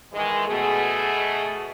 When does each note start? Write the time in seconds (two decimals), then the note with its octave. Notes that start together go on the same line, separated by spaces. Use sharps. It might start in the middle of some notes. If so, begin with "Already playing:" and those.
0.13 G#2 D#3 E3 G#3
0.47 B2 A3 G#4